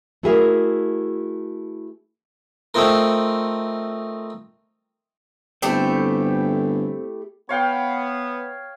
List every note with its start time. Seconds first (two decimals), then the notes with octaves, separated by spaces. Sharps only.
0.23 A3 E4 F#4 G#4 A#4 E5
2.74 A3 C4 D#4 F4 A#4
5.62 G1 A3 C4 E4 G4 C5
7.49 B3 C#5 F5 G5